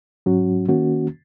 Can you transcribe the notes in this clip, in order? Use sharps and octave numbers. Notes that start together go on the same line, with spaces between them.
G#2 F#3 C#4 F#4
D#3 A#3 C#4 F#4